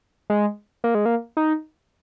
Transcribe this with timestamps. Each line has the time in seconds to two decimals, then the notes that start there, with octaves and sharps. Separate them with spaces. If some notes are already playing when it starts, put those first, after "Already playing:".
0.30 G#3
0.84 A#3
0.95 G#3
1.06 A#3
1.37 D#4